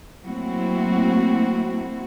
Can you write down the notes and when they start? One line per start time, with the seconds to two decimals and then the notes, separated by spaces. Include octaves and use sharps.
0.24 F#3 A3 A#3 C4 E4 F#4